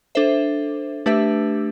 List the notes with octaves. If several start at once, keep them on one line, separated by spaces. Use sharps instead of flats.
D4 A4 C5 E5
A3 D4 G4 B4 E5